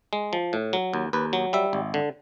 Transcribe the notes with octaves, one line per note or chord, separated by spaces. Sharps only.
G#3
F3
A2
F#3
D#2
D#2 B4
F#3
G3 E5
G#1
D3